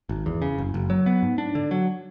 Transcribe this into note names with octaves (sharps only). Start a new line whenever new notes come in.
G#1
E2
C#3
F#1
F#1
F#3
B3
G#2
D4
D3
F#3